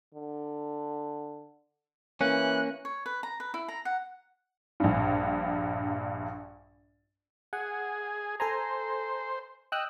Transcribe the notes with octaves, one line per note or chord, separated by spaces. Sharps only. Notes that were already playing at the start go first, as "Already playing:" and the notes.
D3
E3 A#3 C#4 F#6
C#5
B4
A#5
B4
E4
A#5
F#5
A#1 G2
G#4 F#5
A4 C5 G#5 A#5
D#5 G5 E6 F#6